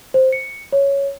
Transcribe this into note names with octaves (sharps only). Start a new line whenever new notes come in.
C5
C#7
C#5